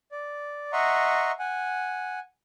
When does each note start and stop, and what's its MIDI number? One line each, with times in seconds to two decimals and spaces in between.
0.12 0.71 74
0.73 1.31 75
0.73 1.31 76
0.73 1.31 78
0.73 1.31 82
0.73 1.31 84
0.73 1.31 85
1.39 2.19 78
1.39 2.19 80